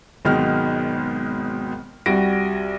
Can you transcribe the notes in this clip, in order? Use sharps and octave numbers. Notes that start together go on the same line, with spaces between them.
G#1 B2 D#3 F#3 G#3 F6
C2 G3 F#4 A#6 D7